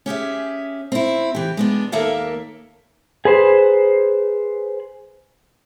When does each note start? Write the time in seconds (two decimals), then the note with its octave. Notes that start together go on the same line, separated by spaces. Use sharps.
0.06 C#4 G4 G#4 E5
0.92 C4 E4
1.35 E3 G4
1.57 G#3 B3 D4
1.92 D#2 A#3 A4 A#4 E5 F5
3.25 G#4 B4 C5